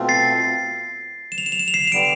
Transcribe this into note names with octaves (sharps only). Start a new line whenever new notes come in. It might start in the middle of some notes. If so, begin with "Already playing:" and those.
Already playing: B2 A3 C4 F4
A6 C7
E7
F7
E7
F7
E7
F7
C7 E7
E7
D3 G3 B3 D7 F7